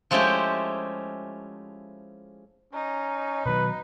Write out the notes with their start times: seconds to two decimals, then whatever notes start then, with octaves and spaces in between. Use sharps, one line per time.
0.11 F3 G#3 A3 C#4 E4 G4
2.73 C#4 D#4
3.46 B2 D#3 F#3 B4